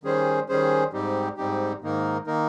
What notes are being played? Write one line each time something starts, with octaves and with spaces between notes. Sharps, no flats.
D#3 G3 C#4 G#4 C5
D#3 G3 C#4 G#4 C5
G#2 G3 C4 D#4 G4
G#2 G3 C4 D#4 G4
G#2 D#3 A#3 D#4 A#4
D#3 A#3 D#4 A#4